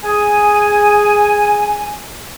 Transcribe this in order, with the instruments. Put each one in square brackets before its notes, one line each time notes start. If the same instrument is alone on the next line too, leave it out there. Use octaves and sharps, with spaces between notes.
[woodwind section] G#4 G#5